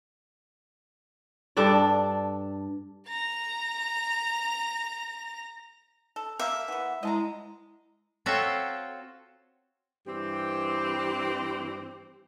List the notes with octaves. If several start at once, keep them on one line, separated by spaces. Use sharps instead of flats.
G2 D4 A4 D5
A#5 A#6
A4
A#3 G4 E5 F5
E3 B3 F#5
G#3 E4 D#5 A5 A#5
C4 F4 F#4 A4 C#5 E5
G2 E3 C4 G4